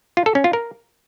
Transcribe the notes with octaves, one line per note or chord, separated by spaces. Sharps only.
F4
A4
C#4
F4
A#4